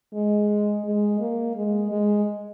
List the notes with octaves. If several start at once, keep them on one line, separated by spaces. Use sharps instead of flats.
G#3
G#3
A#3
G#3
G#3